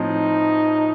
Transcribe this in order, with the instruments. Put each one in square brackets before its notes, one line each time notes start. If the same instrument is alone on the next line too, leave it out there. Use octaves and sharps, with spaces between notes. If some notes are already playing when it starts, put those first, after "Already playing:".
Already playing: [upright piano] A2 F3 C4 C5 [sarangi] D#4